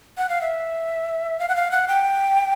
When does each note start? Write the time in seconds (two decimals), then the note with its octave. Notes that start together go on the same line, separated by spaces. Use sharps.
0.18 F#5
0.29 F5
0.41 E5
1.39 F5
1.49 F#5
1.56 F5
1.71 F#5
1.88 G5